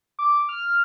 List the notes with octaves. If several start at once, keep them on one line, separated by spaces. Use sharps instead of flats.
D6
F6